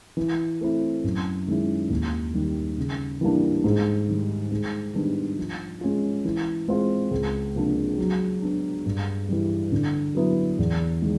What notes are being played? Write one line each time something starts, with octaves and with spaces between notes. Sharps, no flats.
E3
A3 C4 E4
F#2
D#3 G#3 C#4 E4
D#2
D#3 G3
C#3
E3 G3 A#3 D4
G#2
D#3 G3
G#2
D#3 G3 B3 D4
F3
G#3 C#4 F4
E3
G#3 C4 F4
C#2
C3 F3 A#3 D4
F#3
B3 D4
G2
E3 G3
D3
F#3 B3 E4
E2
D#3 G#3